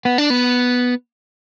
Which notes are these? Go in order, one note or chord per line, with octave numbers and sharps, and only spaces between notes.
B3
D4
B3